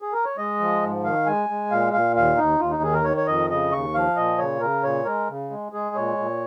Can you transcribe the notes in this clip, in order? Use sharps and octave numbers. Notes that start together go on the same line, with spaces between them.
G#4
A#4
C#5
G#3 D#5
F3
G#2
D#3 F5
G#3 G#5
G#3
A#2 F5
A#2 F5
D#2 F5
D#2 D#4
D#2 F4
D#4
D#3 G#4
A#4
D#3 C#5
C#5
F2 D#5
C#3 D#5
D#2 C#6
F3 F5
A#2 D#5
C#3 C#5
C#3 A#4
A#2 C#5
G#3 A#4
C#3
G#3
G#3 G#4
A#2 C#5
A#2